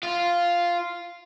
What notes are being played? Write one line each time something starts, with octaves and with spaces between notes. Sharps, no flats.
F4